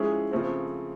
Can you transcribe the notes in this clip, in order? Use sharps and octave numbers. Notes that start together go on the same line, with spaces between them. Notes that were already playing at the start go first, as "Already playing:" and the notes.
Already playing: F3 G#3 C#4 E4 G#4
C#3 F3 A3 C4